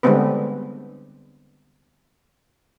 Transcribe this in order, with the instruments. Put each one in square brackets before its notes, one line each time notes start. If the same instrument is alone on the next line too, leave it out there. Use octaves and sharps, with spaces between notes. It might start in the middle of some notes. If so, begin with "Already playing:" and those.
[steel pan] D3 G3 G#3 B3 C4 B4